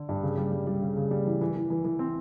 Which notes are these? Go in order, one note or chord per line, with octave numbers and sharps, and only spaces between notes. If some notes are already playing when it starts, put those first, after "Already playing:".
Already playing: D3
G2
C#3
G3
G3
G3
C#3
C#3
G3
E3
E3
E3
E3
E3
C4